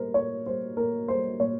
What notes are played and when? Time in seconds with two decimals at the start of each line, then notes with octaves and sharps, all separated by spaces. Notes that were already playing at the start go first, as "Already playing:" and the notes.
Already playing: A#2 G3 A#4 C5
0.14 A#2 C#5
0.46 G3 C5
0.77 A#2 A#4
1.08 G3 C5
1.40 A#2 C#5